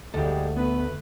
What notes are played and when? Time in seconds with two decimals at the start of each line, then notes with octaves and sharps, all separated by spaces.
0.14 D2 G3 G#3 G4 A4
0.56 A3 B3 B4